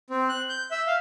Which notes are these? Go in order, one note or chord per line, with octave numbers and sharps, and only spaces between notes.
C4
F#6
G6
E5
F5